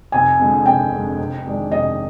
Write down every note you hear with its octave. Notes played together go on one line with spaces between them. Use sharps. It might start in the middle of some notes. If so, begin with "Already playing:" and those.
F1 G#5
F2 D3 G#3
F1 G5
F2 D3 G#3
F1
F2 D#3 G#3 D4
F1 D#5